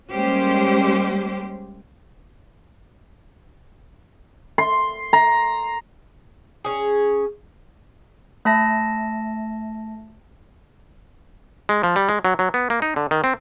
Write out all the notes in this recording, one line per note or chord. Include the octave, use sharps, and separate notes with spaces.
G3 G#3 A#3 C#4 G4 C5
C6
A#5
C#4 G#4
A3 E5 A5 A#6
G#3
F3
G3
G#3
F#3
F#3
B3
A#3
D#4
D3
D#3
C4